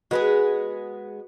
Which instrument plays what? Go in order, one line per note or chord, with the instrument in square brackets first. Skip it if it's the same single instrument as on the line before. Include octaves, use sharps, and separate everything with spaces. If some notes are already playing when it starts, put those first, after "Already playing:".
[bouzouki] G#3 B3 G#4 [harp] F#4 B4